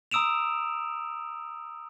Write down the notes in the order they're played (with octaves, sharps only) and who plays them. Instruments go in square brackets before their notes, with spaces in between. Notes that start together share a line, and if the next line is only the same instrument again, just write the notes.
[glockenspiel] A#5 D#6 E6 D7 E7 F7